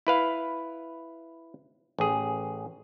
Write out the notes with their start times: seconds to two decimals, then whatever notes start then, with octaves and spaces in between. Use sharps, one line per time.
0.07 E4 B4 F5
1.99 A1 G#4